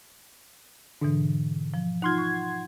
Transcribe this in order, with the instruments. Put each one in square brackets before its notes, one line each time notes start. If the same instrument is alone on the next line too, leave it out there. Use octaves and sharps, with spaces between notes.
[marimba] G#2 B2 E3 [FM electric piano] D3
[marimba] F3
[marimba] D#4 F4 [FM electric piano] F#5 C6 G#6
[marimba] C#6